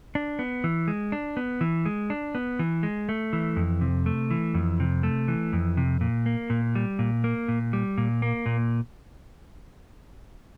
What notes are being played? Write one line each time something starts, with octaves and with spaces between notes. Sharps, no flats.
D4
B3
E3
G#3
D4
B3
E3
G#3
D4
B3
E3
G#3
A3
E3
F2
C3
A3
E3
F2
C3
A3
E3
F2
C3
A#2
A#3
A#2
G3
A#2
A#3
A#2
G3
A#2
A#3
A#2